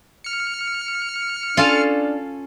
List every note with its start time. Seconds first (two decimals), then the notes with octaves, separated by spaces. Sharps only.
0.24 F6 C#7
1.57 C#4 D4 F4 A4 F5